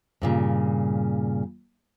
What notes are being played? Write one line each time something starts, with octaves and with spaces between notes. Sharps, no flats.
G2 A#2 C#3